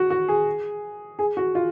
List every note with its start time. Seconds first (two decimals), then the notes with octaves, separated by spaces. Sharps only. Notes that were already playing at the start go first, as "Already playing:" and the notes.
Already playing: F#4
0.10 F#4
0.28 G#4
1.19 G#4
1.37 F#4
1.55 F4